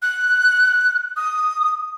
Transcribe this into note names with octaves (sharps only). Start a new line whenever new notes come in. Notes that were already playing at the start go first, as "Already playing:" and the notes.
F#6
D#6